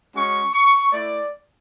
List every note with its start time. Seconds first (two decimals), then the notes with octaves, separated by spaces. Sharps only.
0.15 G#3 C#4 F#4 C#6
0.54 C#6
0.93 A3 E4 D5